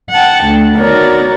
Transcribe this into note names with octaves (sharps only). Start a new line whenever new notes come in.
F#5 G5 A5
D2
D#3 B3 F#4 A#4 C#5 D5